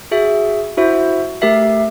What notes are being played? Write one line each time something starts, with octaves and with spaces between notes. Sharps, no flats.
F#4 G#4 E5
E4 F#4 C5 E5
A3 G4 A#4 E5 C7